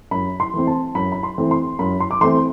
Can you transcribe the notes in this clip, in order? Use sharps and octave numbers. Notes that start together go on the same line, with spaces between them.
F#2 B5
C6
E3 A3 C4
A5
F#2 B5
B5
C6
E3 A3 C4
C6
F#2 B5
C6
D6
E3 A3 C4 C6